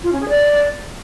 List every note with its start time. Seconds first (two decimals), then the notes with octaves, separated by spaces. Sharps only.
0.04 F4
0.12 C#4
0.21 G#4
0.29 D5